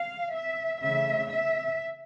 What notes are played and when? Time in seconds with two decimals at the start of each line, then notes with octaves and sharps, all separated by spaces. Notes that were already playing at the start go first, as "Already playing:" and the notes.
Already playing: F5
0.34 E5
0.82 C#3 E3 A3 E5
1.31 E5